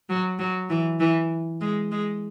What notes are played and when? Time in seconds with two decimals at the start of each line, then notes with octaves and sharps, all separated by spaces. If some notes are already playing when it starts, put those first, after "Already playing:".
0.09 F#3
0.39 F#3
0.70 E3
1.00 E3
1.61 G#3
1.91 G#3